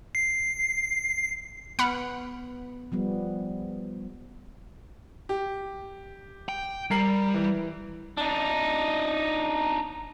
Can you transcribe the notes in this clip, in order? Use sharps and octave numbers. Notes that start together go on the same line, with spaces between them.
C7
B3 F#5 B5 F6
F3 G3 B3
G4
G5
G3 A#4 C7 F#7
E3
D4 D#4